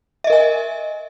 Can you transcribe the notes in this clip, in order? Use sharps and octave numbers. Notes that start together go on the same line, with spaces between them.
A#4 D#5 E5 G#5